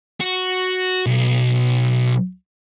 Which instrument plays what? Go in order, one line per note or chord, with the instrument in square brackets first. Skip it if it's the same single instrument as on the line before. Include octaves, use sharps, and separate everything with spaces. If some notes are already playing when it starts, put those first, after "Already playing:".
[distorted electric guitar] F#4
B1